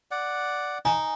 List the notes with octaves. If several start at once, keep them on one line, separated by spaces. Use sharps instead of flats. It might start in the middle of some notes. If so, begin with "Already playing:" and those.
D5 F#5
D#4 G#5